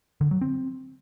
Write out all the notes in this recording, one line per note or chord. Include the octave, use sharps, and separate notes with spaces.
D3
F#3
C4